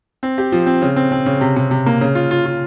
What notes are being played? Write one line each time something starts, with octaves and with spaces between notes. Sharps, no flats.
C4
G4
F3
C4
C#3
C4
C4
C#3
C3
C3
C3
A#3
C#3
F4
F4
F4